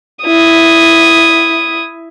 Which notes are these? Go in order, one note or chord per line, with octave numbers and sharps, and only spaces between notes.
E4 D#6